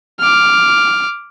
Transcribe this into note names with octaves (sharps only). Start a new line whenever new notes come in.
D6 F6